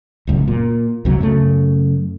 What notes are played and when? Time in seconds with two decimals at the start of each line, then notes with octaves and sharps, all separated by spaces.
0.27 D1 C#2 F#2
0.48 A#2
1.05 C#2 C3 F#3
1.21 F#2 C#3 A3